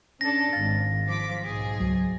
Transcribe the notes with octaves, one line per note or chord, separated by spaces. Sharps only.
C#4 D4 A4 A5 A6 A#6
G#1 F5 A6
F3 D6 B6
B1 G#2 G#4
C#2 F#3